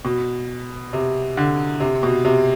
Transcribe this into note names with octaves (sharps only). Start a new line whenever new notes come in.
B2
C3
D3
C3
B2
C3